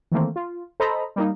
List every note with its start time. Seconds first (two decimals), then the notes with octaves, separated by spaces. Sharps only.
0.12 D#3 E3 A3 A#3 C4
0.36 F4
0.80 A4 C5 D#5 A#5 B5
1.16 G3 A#3 D#4